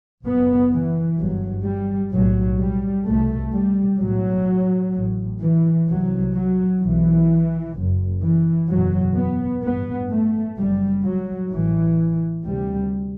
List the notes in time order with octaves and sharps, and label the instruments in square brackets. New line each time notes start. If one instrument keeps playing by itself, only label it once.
[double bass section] F#1 F#2 B3
E3
G1 G2 F#3
G3
B1 A2 F#3
G3
C2 B2 A3
G3
B1 A2 F#3
A1 A2
E3
C2 C3 F#3
F#3
B1 B2 E3
F#1 F#2
E3
F#1 E2 B2 F#3
B3
A1 G2 B3
A3
F#1 F#2 G3
F#3
A1 A2 E3
D2 C3 G3